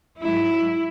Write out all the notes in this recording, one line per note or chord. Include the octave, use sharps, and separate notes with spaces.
G#2 F#3 E4